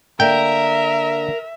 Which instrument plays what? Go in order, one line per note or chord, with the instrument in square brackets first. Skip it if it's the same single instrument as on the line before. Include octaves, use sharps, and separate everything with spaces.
[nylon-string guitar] D3 A#3 [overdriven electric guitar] A#4 [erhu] E5 [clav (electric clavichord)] G5